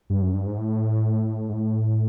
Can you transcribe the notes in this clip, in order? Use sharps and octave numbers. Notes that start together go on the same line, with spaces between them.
G2
F#2
G2
G#2
A2
G#2
A2